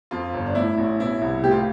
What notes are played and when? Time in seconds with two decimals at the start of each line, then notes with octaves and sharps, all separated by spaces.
0.11 F2 F4
0.34 G1
0.46 D4
0.55 A2 E4
0.78 A1
0.99 B2 E4
1.21 C2
1.44 A2 G4
1.51 F4